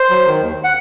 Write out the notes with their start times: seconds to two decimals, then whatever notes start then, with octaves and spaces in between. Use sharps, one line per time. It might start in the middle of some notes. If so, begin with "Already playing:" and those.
Already playing: C5
0.10 F#3
0.26 D#3
0.41 D#2
0.64 F#5